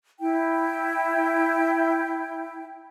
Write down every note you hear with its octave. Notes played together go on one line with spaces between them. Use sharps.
E4 G5